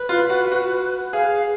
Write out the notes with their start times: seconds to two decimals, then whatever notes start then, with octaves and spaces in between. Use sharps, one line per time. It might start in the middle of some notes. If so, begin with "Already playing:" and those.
Already playing: B4
0.09 F4
0.30 F#4
0.52 F#4
1.13 G#4 F5